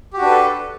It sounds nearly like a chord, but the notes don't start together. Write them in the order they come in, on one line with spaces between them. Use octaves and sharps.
G4 F#4 D4 B4 A4